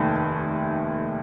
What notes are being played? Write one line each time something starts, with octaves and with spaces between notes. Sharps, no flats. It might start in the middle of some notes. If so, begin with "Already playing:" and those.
Already playing: F1 D#2 D#3 A3